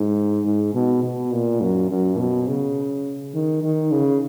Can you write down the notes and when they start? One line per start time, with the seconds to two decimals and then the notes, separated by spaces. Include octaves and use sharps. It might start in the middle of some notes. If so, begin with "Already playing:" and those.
Already playing: G#2
0.45 G#2
0.74 B2
1.03 B2
1.32 A#2
1.61 F#2
1.89 F#2
2.18 B2
2.47 C#3
3.34 D#3
3.62 D#3
3.91 C#3